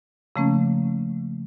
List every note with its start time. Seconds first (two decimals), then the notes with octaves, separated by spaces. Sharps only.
0.36 C#3 F3 A3 A#3 C#4